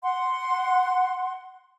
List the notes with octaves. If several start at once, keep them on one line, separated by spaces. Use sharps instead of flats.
F#5 C6